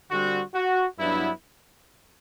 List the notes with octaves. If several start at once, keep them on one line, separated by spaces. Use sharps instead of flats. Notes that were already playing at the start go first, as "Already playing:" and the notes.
D3 G3 C4 F#4
F#4
G2 F#3 B3 D4 E4